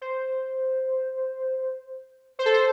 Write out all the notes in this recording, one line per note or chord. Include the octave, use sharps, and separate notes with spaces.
C5
C5
A4
C5